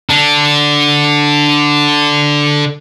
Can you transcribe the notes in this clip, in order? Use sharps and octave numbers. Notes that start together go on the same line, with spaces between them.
D3 D4